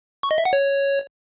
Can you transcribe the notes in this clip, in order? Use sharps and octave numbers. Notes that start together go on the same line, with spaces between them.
C#6
D#5
E5
F#5
C#5